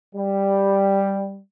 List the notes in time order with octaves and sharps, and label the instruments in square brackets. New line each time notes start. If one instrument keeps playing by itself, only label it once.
[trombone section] G3